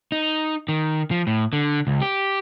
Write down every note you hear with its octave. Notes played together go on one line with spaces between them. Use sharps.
D#4
D#3
F3
A2
D3
C#2
G4